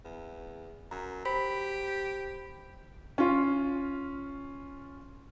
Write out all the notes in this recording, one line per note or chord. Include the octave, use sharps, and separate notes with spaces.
E2
F#2 A#5
G4 C5 B5 B6
C#4 F4